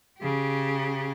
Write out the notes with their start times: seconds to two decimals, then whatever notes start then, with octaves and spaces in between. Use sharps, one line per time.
0.18 C#3 G4